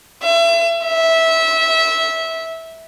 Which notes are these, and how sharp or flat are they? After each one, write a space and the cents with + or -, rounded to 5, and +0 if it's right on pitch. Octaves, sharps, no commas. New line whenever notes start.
E5 +35
E5 -15